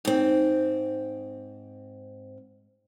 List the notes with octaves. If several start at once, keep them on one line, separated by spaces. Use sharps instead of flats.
G#2 C4